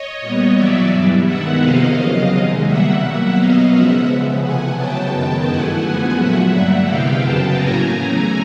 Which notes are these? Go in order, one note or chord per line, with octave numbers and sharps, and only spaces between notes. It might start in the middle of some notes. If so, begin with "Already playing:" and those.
Already playing: C#5 D#5
A#2 G3 B3
E2 B2 F#3 D5 E5
G2 E3 G3
G2 D#3 G#3 B3 E5 F#5
C3 F3 A#3 D#5 F5
E2 C#3 F#3
C3 D#3 G#3
B2 G3 A#3 E5 F#5
B2 F#3 A#3
B2 F#3 B3 D#5 F5
C#3 F3 G#3 E5 F#5
C#3 F3 G#3 B3
C3 E3 A3 F#5 G#5
C#3 F#3 B3 G5 A5
F#2 D#3 G#3 B3
G2 E3 A3 F#5 G#5
F#2 D3 F3 G#3 B3 F#5 G#5
A#2 F#3 A3 E5 F#5
G2 D3 G3 A#3
C3 E3 G#3 B3 F5 G5
F#2 C#3 F#3 B3 G5 A5
A2 F#3 A#3 G#5 A#5
E2 C#3 E3 A3